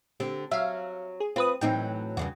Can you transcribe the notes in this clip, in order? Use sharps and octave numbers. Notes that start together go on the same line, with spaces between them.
D3 C4 G4
F#3 E5 F5
G#4
C4 F4 B4 D#6
A2 E3 F#3 C4 D#4 G5
E2 G2 C#3 F#4